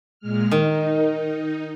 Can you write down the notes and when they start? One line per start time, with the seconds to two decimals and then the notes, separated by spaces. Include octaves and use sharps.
0.19 A#2 G#3 F6
0.51 D#3 D#4